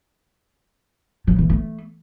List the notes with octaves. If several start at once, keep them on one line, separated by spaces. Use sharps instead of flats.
F3
E3
A3